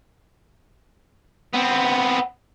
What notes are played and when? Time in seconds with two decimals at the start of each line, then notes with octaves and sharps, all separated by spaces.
1.53 B3 C4